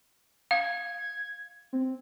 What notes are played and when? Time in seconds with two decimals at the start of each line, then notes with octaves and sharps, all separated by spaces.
0.51 F5 G#6
1.73 C4